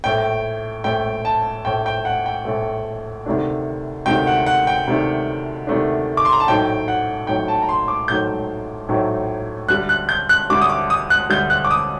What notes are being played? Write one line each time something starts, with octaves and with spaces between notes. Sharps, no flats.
A#1 A2 A3 G5
A#1 A2 A3 G5
A5
A#1 A2 A3 G5
G5
F#5
G5
A#1 A2 A3
D2 C3 D#3 A3 D4
D2 C3 D#3 A3 D4 G5
F#5
F#5
G5
D2 C3 D#3 A3 D4
D2 C3 D#3 A3 D4
D6
C6
A#5
A5
A#1 A2 F#3 A3 D#4 G5
F#5
A#1 A2 F#3 A3 D#4 G5
A5
A#5
C6
D6
A#1 A2 F#3 A3 D#4 G6
A#1 A2 F#3 A3 D#4
D2 D3 G3 F#6
F#6
G6
F#6
D2 D3 G3 D6
D#6
D6
D#6
F#6
D2 D3 G3 G6
F#6
D6
D#6